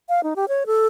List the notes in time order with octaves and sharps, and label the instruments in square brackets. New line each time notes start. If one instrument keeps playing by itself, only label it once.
[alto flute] F5
D#4
G4
C#5
A4